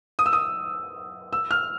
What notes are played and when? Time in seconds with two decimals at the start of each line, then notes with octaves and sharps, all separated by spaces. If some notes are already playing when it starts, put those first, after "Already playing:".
0.19 D#6
0.26 E6
0.33 D#6
1.33 E6
1.51 F6